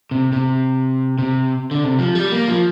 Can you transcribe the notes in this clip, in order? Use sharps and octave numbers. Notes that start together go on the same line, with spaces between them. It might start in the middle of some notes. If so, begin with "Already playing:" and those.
C3
C3
C3
D3
C3
F3
G3
A#3
F3